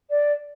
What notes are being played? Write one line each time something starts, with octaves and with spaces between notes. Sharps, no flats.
D5